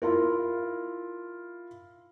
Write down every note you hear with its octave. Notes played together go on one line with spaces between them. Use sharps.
E4 F4 A#4